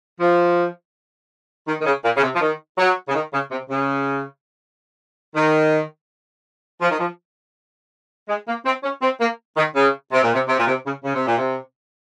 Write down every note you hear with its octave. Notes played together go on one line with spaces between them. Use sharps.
F3
D#3
D#3
C#3
A#2
C#3
C3
F3
D#3
F#3
C#3
D#3
C#3
C3
C#3
D#3
F3
D#3
F3
G#3
A#3
C4
C#4
C4
A#3
D#3
C#3
C3
A#2
C3
C3
A#2
C3
C#3
C#3
C3
A#2
C3